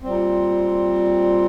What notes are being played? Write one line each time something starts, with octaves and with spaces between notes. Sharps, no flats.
A#2 G3 C4